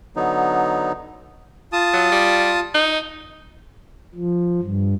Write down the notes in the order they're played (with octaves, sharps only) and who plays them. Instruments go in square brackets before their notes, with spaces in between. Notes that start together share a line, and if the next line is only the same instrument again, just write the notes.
[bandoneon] D3 F#3 B3 D#4
[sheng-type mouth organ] F4 A5 D#6
[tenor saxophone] F#3
G3
D#4
[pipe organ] F3
G2